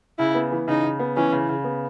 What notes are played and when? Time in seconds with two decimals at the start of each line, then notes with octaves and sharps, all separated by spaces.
0.19 C#3 E4
0.35 B3
0.52 E3
0.67 C#3 D#4
0.83 C#3
0.99 B3
1.16 E3 C#4
1.32 C#3
1.49 C#3
1.64 B3